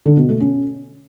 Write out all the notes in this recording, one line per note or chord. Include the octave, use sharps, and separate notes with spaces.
D3
B2
A3
C#4